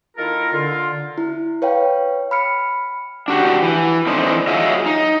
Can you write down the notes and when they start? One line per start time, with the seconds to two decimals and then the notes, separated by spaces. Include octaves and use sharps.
0.17 D#3 A#3 E4 F4 A4 A#4
0.53 D3 F4
1.18 E4
1.62 B4 C#5 F5 G5
2.31 B5 F6 C#7
3.28 D4 F#4 G4
3.62 E3
4.07 D3 E3 A3 C4 D4 D#4
4.48 F#3 F4 G#4 D#5 E5
4.86 D#4